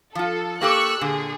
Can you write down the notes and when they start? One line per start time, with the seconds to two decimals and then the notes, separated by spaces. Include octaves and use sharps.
0.15 F3 F4 A4
0.61 A#3 G4 A4 C#6 E6 F#6
1.01 A#2 D3 G#4